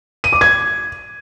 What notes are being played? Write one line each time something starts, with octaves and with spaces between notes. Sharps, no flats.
D#7
D6
G#6